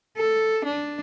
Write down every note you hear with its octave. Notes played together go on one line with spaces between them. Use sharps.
A4
D4